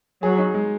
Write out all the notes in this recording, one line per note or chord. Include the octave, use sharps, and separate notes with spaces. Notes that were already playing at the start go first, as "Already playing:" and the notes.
F#3 G#4
D#4
G#3